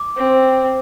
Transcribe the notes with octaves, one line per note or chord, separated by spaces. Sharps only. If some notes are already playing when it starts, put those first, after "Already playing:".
Already playing: D6
C4